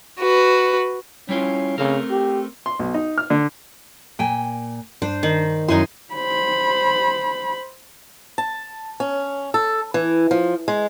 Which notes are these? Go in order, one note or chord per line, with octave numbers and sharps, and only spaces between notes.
F#4 B4
G3 C#4 E4 F4
C#3 A3 C4 A#4
G4
C6
B1
D#4
F6
D3
A#2 G5 G#5
G2 D4 C5
D#3
F#2 F#3 D#4 E4 G#5 C6
C5 B5
A5
C#4
A4
E3
F3
G#3